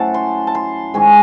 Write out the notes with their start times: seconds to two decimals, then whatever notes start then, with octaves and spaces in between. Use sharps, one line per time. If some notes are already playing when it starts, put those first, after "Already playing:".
Already playing: A2 F#3 C#4 E4 C5 F#5 A5
0.14 C6
0.47 A5
0.55 C6
0.94 G#2 D#3 G#3 C#4 G#5